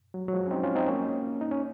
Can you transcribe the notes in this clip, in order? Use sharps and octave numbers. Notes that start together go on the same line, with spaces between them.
F#3
F#3
F3 G#3
C#4
C4 D#4
C#4 F4
C4 D#4
A#3 C#4
D#4
C#4